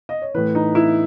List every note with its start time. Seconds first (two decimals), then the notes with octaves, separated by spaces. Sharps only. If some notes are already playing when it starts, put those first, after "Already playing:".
0.09 D#5
0.22 C#5
0.34 A2 E3 B4
0.55 D#4
0.75 E4